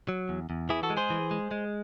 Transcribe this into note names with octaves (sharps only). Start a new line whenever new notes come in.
F#3
E2
E2
E3 E4 G#4
F#4 A4
G#3
G#4 C5
E3
G#3
G#3